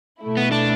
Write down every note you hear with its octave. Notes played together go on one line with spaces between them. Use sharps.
B2 A3 E4
B3
D4